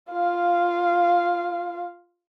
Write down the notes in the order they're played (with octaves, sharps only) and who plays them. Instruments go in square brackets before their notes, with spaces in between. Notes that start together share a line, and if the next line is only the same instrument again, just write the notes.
[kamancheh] F4 F5